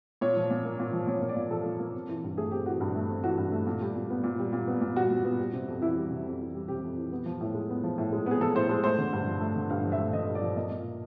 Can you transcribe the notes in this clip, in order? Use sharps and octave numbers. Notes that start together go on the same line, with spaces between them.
A#2 C#5
F3
A#2
A#3
A#2
F3
A#2 C#5
A#3
D5
A#2
F3 A4
A#2
A#3
C4
E3
G2
A3 G#4
C4 G4
E3 F#4
G2
A3
C4
E3 F#4
G2
A3
A#2
G3
A#2
B3
A#2
G3
A#2
B3
A#2
G3 F#4
A#2
B3
G3
C3
F2
E3 E4
G3
C3
F2
E3
G3
C3 G4
F2
E3
B3
F3
A2
G#3
B3
F3
A2
G#3
B3 G#4
F3 A4
A2 C5
G#3 C5
A3 C5
D3
G2
F3
A3
D3
G2 F5
F3
E5
A3
D3 D#5
G2
D5
F3
A#3 D#5
A#2